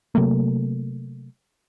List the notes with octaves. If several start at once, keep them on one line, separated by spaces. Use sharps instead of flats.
C3 F#3 A3 A#3